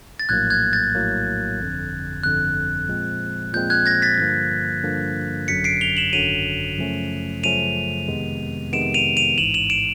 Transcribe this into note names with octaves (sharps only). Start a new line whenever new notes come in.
A6
A#1 A2 F#3 A#3 F#6 G#6
F#6 G#6
G6 A6
A#1 A2 F#3 A#3
G1 F2 D3
G1 F2 D3 F#6
A#2 F3 G#3 C4
A#2 F3 G#3 C4 G6
F#6 G#6
G#6 A#6
A6 B6
G2 D3 F3 A#3
G2 D3 F3 A#3
G#1 F#2 D3 F#3 B6 C#7
C7 D7
F7 G7
E7 F#7
G#1 F#2 D3 F#3 D#7 F7
F#2 C#3 F3 A3 C#4
F#2 C#3 F3 A3 C#4 D#7 F7
F2 C3 D#3 G#3 B3
F2 C3 D#3 G#3 B3 D7 E7
D#7 F7
D#7 F7
A1 G#2 E3 E7 F#7
E7 F#7
D7 E7